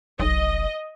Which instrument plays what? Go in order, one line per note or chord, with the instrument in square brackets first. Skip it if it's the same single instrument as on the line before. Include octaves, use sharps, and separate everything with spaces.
[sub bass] F1 [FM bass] B1 [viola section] D#5